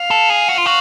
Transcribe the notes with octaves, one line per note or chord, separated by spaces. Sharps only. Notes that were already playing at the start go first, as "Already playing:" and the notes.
Already playing: F5
A4
G#4
F#4
F4
F#4